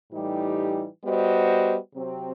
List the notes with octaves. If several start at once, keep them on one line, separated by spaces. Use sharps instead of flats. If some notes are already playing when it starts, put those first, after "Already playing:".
A2 E3 G3 D#4 G4
G3 B3 F#4 C5 D#5
C3 F#3 C4